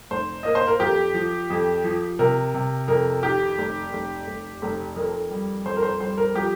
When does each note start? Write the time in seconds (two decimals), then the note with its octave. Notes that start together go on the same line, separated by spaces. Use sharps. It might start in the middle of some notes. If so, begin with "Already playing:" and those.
0.10 F1 C5
0.43 A#3 D#5
0.55 C5
0.67 A#4
0.80 F2 G4
1.14 F3
1.50 F2
1.84 F3
2.19 C3 A#4
2.54 C3
2.88 F2 A#4
3.23 D#3 G4
3.58 F1
3.93 F1
4.27 F1
4.62 F1
4.96 F2 A#4
5.31 G3
5.66 F2 C5
5.76 A#4
5.83 C5
6.00 G3 C5
6.18 A#4
6.35 F3 G4